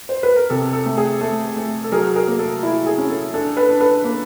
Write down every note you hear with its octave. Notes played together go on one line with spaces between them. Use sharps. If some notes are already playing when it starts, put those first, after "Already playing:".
C5
B4
A#4
C3 A4
A4
A3
G#4
A3 A4
A3
A4
F#3 G#4 A#4
G#4 A#4
A#3
A4
E4
G#4
C#4
A4
D4 A4
A4 B4
D4
A4 B4
A#3